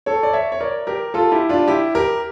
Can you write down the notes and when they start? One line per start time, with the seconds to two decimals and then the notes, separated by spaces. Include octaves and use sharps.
0.06 A4 C#5
0.23 D5
0.33 C#5 E5
0.52 C#5
0.61 A#4 D5
0.87 G4 A#4
1.14 F4 A4
1.32 E4 G4
1.49 D4 F4
1.68 E4 G4
1.95 G4 A#4